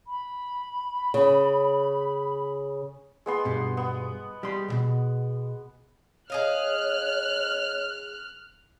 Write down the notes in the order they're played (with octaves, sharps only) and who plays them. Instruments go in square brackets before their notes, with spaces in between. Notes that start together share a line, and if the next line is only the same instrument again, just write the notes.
[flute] B5
[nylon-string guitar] C#3
[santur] G#3 B3 C6
[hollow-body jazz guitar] G2 B2
[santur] B3
[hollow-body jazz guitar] G3 C6
B1 B2
[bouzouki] G#4 D#5 F5 [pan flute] C#5 [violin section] F6 F#6